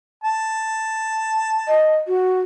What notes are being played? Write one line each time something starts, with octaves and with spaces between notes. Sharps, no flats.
A5
D#5
F#4